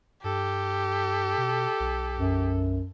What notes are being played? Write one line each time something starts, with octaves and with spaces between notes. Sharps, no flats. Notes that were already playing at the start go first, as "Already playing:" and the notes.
G2 G4 A4
B2
B1
F#2